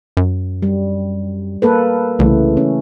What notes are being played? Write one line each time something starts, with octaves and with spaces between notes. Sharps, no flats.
F#2
G3
A#3 A4 B4
C2 C#3 E3 A3
C#4